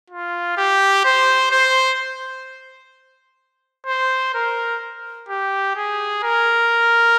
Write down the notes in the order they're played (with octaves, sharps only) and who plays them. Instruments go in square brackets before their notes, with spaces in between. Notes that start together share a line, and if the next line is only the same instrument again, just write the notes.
[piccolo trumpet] F4
G4
C5
C5
C5
A#4
G4
G#4
A#4